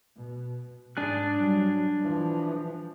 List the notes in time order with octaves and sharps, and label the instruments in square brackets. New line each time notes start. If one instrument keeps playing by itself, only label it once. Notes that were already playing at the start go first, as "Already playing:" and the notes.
[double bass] B2
[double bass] G#2 [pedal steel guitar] D4 G#4 F#6
[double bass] F#3 G3
E3 F3